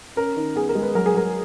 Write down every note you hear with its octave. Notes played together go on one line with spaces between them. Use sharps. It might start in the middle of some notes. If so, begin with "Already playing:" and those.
C#4 A#4
D#3
B3 G#4
A#4
G#3
B4
F#3 A#4
G#4
F#3 A#4